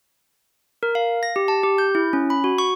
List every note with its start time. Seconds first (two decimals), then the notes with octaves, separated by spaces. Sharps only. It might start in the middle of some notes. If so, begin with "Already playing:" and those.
0.83 A#4
0.95 F5
1.23 A#6
1.36 G4
1.48 A5
1.63 G4
1.78 G6
1.95 E4
2.13 C#4
2.30 B5
2.44 F#4
2.58 C#6